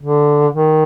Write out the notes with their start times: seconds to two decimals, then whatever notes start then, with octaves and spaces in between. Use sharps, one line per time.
0.03 D3
0.53 D#3